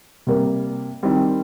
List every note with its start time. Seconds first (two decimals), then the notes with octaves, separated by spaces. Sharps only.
0.27 C3 G3 A#3
1.03 D#3 G3 C4